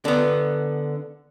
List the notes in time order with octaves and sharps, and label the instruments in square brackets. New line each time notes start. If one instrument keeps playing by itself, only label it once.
[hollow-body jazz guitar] D3 B3